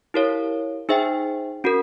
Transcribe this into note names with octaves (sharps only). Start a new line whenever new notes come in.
E4 G4 A#4 C#5 F5
D#4 G#4 C5 E5 G5
C#4 F#4 A#4